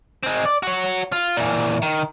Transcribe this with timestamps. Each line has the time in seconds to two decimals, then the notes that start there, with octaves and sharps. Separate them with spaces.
0.23 G#3 C4
0.46 D5
0.63 F#4 C#5
1.12 F4
1.37 A#2 E3
1.82 D#3